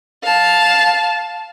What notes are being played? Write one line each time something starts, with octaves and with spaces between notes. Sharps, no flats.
F5 A5